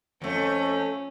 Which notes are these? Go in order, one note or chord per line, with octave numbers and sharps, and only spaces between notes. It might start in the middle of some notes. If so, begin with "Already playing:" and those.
F2 A3 C#4